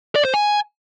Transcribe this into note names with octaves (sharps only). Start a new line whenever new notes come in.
D5
C5
G#5